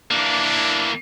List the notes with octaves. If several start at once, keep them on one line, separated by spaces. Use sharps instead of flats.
E3 A#3 D4